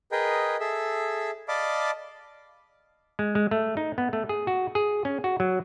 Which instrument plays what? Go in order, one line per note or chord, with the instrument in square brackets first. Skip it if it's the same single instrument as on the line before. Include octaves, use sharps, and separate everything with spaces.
[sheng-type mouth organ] G#4 A#4 B4 D#5 G5
G#4 A4 E5
D5 D#5 F5 A5 B5 D6
[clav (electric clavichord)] G#3
G#3
A3
D#4
B3
A3
G#4
F#4
G#4
C#4
F#4
F#3